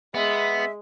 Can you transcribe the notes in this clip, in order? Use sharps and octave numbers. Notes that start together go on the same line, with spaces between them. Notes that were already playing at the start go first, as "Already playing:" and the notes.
G#3 B3 E5